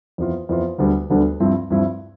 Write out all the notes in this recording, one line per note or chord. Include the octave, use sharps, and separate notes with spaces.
F2 E3 B3 F4
F2 E3 B3 F4
D2 D3 G3 B3 D4
D2 D3 G3 B3 D4
G2 F3 C4 E4
G2 F3 C4 E4